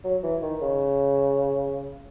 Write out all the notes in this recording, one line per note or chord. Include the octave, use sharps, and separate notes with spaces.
F#3
E3
D#3
C#3